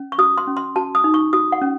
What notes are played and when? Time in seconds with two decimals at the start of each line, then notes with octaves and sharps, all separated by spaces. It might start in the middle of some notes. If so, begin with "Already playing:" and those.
Already playing: C#4
0.12 C#6
0.18 F#4 D#6
0.38 C6
0.47 C#4
0.57 C6
0.76 F#4 A5
0.95 D#6
1.04 D#4
1.14 C#6
1.33 F#4 D#6
1.52 F#5
1.62 C#4